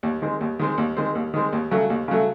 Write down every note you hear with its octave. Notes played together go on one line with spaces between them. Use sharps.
D#2
D#3 G#3 C4
D#2
D#3 G#3 C4
D#2
D#3 G#3 C4
D#2
D#3 G#3 C4
D#2
C#3 F#3 A3
D#2
C#3 F#3 A3